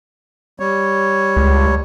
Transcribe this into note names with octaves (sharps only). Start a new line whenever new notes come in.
G3 C#5
C#2